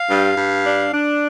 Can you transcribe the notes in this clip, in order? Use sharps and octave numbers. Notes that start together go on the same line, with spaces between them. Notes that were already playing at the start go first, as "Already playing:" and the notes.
Already playing: F5
G2
G2
D4
D4